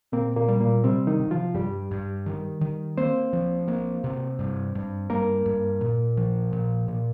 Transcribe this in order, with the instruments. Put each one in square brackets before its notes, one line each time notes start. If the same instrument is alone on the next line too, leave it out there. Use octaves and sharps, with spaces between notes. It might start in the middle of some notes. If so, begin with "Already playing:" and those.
[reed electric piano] A#2 A#3 [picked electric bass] C4
[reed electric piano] A#2 A#3
[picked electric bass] G3
[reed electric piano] A#2 A#3
[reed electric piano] C3 C4 [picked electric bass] G3
[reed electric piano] D#3 D#4
[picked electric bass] C3
[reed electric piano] F3 F4
[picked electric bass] G2 [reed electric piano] G3 G4
[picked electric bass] G2
D#3
D#3
[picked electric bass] A#3 [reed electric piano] C4 C5
[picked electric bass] F3
A#3
C3
G2
G2
[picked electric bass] G2 [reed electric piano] A#3 A#4
[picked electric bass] G2
A#2
F3
A#2
A#2